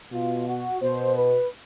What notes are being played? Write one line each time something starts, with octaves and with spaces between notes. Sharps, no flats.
B2 F4
F#4
B2 C5
B4